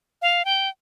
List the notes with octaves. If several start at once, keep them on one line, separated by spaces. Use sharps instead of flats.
F5
G5